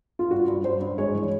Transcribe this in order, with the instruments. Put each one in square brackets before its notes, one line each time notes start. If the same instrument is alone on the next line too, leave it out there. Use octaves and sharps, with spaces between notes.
[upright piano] F4
[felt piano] G2 [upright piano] F#4
[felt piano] G2
[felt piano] G2 [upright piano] C5
[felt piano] G2
[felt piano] G#3 [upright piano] C#5
[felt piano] E3